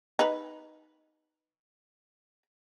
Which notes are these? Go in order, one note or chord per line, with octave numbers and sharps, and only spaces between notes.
D#4 B4